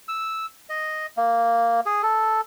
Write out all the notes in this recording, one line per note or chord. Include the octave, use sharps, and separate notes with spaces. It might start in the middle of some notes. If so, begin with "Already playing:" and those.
E6
D#5
A#3
G#4
A4